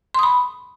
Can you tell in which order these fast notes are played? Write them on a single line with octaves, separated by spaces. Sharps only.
C6 D#6 B5